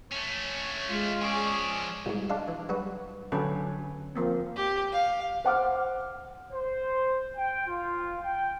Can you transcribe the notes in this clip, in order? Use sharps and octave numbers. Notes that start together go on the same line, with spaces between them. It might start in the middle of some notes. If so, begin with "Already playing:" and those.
A3 C#4 C#5
G#3 F4
F3 C#4 G#4 D5
C2 G#2 B2
G#3 D4 F5
E3
F#3 G3 F#4 B4
D3 F#3 C#4 A4 B4
F3 A#3 C4
G4
F5
C5 F#5 D6 F6
C5
G5
F4
G5